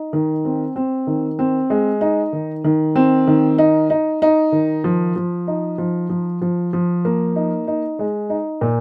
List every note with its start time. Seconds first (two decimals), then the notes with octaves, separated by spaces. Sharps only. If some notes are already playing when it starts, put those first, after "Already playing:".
Already playing: D#4
0.13 D#3
0.45 C4
0.76 C4
1.07 D#3
1.39 C4
1.70 G#3
2.01 D#4
2.33 D#3
2.64 D#3
2.96 C4
3.27 D#3
3.58 D#4
3.90 D#4
4.22 D#4
4.52 D#3
4.84 F3
5.16 F3
5.47 D#4
5.78 F3
6.10 F3
6.42 F3
6.73 F3
7.05 A#3
7.36 D#4
7.67 D#4
7.99 G#3
8.30 D#4
8.61 A#2